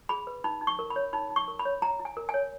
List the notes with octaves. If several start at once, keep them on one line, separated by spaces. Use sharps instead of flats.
G#4 B5
B4
D#4 B5
D#4
C#6
A#4
B5
C#5
D#4 B5
D#4
C#6
A#4
B5
C#5
E4 A#5
E4
G#5
A#4
G#5
C#5